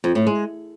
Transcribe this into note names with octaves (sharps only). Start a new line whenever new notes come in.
F2
A2
G#3